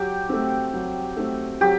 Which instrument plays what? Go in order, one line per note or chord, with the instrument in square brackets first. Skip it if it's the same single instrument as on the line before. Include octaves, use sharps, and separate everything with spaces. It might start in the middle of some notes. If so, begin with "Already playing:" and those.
Already playing: [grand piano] F#3 [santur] G4
[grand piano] A3 C4
F#3
A3 C4
[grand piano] F#3 [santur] G4